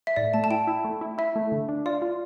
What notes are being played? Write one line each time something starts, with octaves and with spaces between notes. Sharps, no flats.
E5
A2 D5
A3 A5
A5
E4 G5
E4
A3
E4
E4 E5
A3
D3
D4
F4 D5
F4